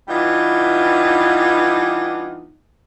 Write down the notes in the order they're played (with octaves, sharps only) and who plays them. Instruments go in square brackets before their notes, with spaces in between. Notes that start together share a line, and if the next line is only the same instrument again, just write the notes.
[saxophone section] E3 G3 B3 D4 D#4 F4